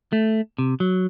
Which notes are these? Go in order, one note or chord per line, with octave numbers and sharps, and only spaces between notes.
A3
C3
F#3